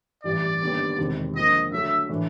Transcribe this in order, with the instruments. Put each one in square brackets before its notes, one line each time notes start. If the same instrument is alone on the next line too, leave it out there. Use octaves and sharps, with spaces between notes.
[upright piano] A1 G2 E3 G3 [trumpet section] D5
[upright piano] D#2 D3 G3 B3
E1 E2 C3 D#3
[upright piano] D3 F3 A#3 [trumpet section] D#5
[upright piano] D3 F#3 A3 [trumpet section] E5
[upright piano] A2 E3 A3 D4